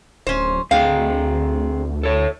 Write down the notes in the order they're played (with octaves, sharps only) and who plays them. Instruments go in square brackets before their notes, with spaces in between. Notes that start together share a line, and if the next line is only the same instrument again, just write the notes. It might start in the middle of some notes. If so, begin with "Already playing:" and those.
[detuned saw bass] D1 [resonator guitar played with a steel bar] C#4 C5
[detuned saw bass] D2 [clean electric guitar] C4 G#4 G5 [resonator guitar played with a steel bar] F5
[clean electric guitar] A4 C#5